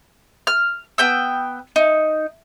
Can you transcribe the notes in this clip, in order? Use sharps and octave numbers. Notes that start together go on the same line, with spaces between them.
F6
B3 G5 E6
D#4